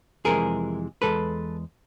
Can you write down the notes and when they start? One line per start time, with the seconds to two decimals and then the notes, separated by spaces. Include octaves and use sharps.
0.25 F2 C3 E3 G#3 G#4 A#4
1.02 E2 B2 G#3 A4 B4